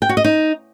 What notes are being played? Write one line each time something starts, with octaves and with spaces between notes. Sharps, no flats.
G5
F#4
D#5
D#4